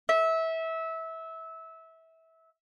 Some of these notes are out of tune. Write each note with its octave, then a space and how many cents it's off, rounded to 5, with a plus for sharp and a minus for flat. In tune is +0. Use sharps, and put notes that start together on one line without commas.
E5 -20